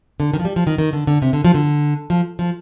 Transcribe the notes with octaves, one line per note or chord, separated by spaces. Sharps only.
D3
D#3
F3
G3
F3
D#3
D#3
D3
D3
C3
D3
F3
D3
F3
F3